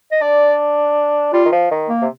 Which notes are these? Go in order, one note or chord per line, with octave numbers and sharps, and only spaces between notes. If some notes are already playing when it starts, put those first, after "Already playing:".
D#5
D4 D5
G3 F4
D#3
F3
D#3
A#3
C3